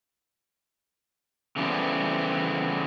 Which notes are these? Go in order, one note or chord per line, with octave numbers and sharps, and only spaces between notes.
C#3 E3 G3 A3 B3 C4